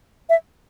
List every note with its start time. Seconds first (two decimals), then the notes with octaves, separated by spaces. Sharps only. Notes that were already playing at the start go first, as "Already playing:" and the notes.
0.29 E5